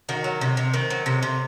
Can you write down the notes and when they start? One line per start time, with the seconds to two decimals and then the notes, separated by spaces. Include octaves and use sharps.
0.09 D#3 F#4
0.24 F#3
0.41 C3
0.57 C3
0.73 D#3 C5
0.90 F#3
1.06 C3
1.23 C3